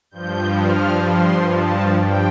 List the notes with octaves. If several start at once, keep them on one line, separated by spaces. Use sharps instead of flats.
G2 F3 G6
F6
C6
A5
G2 F3 G5